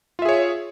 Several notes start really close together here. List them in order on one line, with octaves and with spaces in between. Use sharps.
F4 E5 G#4 C#5